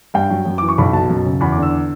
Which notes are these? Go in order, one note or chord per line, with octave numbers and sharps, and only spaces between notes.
G2 G5
F#3
F#2
E3 D6
C#6
B1 B5
B2 A5
F#2
C#3
E2 B5
D6
D3
E6